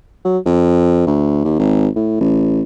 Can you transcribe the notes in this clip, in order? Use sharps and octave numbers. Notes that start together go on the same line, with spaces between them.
F#3
F2
D2
D#2
G#1
A2
A1